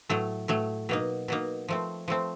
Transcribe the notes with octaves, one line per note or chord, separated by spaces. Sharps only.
A2 F#3 A3
A2 F#3 A3
B2 F#3 A#3 D#4
B2 F#3 A#3 D#4
F3 A3 C4
F3 A3 C4